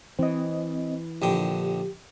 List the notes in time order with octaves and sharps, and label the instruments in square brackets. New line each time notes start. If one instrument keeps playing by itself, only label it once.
[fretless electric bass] E3 [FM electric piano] C4 D#5
[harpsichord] A#1 D3 G5 [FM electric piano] G4